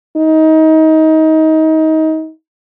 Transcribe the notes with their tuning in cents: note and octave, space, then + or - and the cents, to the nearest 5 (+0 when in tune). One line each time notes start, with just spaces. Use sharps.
D#4 +25